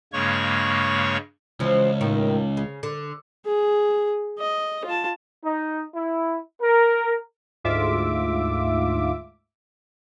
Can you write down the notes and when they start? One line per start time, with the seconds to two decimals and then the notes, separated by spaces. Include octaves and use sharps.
0.13 G2 C#3 G#3 A#3 C#5 C#6
1.60 C#2 E3 F3
2.01 D#2 A2 D#3
2.57 C#3
2.83 D3
3.46 G#4
4.39 D#5
4.85 F4 A5
5.44 D#4
5.95 E4
6.62 A#4
7.64 D2 G#2 F4 E5 D6